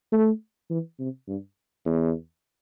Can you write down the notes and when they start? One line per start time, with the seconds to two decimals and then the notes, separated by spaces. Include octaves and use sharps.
0.12 A3
0.70 E3
1.00 C3
1.28 G2
1.85 E2